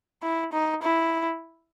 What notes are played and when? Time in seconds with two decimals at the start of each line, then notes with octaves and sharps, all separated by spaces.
0.22 E4
0.53 D#4
0.83 E4